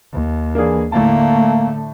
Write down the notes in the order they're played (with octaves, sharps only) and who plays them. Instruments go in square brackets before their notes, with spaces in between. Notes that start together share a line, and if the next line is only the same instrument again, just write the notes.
[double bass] D#2
[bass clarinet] E3 [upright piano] A#3 D4 G#4
[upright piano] A2 A5 [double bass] D3 A3 [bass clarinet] A#3